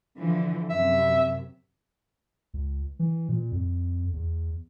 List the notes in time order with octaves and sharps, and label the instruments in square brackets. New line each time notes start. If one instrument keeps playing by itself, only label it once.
[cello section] D3 E3 F3
[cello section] F#2 C3 [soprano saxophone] E5
[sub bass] C#2
E3
A#2
F2
E2